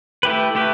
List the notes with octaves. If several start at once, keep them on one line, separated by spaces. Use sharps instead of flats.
A3 E4 G4 B4
A3 E4 G4 B4